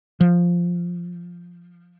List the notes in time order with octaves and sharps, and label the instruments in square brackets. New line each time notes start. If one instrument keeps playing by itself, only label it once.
[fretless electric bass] F3